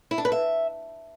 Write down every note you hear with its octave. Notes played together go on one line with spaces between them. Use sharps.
E4
D4
B4
E5